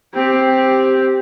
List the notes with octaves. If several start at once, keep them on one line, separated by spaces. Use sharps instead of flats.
C4 G4